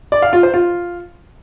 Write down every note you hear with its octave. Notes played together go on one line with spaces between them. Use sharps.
D5
F5
F4
C5
F4